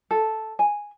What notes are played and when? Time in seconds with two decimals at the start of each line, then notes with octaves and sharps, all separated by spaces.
0.11 A4
0.59 G#5